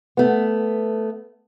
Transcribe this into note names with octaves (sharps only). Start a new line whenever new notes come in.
A3 B3